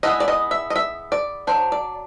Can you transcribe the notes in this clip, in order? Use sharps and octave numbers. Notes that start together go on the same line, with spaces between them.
G#3 B3 E4 D#5
D5
D#5
E5
D#5
E5
D5
F#3 A3 D4 C5
D5